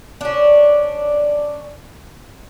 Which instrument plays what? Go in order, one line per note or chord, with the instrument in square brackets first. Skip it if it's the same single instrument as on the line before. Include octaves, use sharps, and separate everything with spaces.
[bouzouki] C#4 D4